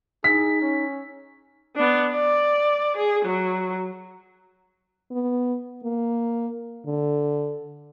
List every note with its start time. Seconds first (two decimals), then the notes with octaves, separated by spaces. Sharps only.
0.24 D#4 G#4 B6
0.61 C#4
1.76 B3 D4
2.11 D5
2.97 G#4
3.25 F#3
5.12 B3
5.84 A#3
6.86 D3